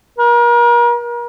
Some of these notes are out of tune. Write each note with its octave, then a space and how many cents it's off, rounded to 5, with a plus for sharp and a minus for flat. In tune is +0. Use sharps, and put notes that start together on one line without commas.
A#4 +40